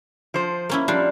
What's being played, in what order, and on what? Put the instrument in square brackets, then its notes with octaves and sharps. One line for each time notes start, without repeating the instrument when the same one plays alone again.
[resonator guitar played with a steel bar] F3 C5
[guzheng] A#3 C#4 E4
[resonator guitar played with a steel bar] F3 [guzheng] G3 D4